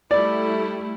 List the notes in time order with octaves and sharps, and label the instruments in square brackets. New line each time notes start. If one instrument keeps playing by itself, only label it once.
[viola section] G3 A3 E4 [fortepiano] D5